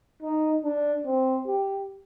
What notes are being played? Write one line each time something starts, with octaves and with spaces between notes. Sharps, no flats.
D#4
D4
C4
G4